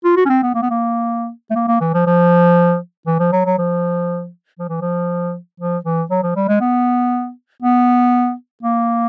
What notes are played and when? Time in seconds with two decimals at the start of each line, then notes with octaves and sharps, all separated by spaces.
0.04 F4
0.17 F#4
0.26 C#4
0.29 C4
0.43 B3
0.55 A#3
0.63 B3
0.71 A#3
1.51 A3
1.56 A#3
1.68 A#3
1.81 E3
1.94 F3
2.07 F3
3.07 E3
3.20 F3
3.33 F#3
3.46 F#3
3.58 F3
4.59 F3
4.69 E3
4.81 F3
5.60 F3
5.85 E3
6.11 F#3
6.23 F3
6.36 G3
6.48 G#3
6.61 B3
7.62 B3
8.63 A#3